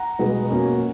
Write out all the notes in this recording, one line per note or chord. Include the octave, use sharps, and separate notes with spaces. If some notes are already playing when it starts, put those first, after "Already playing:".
Already playing: F#5 A#5
B2 G#3 B3
B2 F#3 A#3 C#4